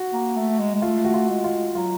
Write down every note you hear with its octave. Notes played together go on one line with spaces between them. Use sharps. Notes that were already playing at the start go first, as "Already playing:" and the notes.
Already playing: F#4
A#3
A3
G#3
G#3
A3 F4
F#4
F4
G#3
F4
F#3 F4